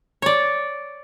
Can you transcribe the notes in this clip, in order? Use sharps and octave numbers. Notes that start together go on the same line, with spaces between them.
C#5 D5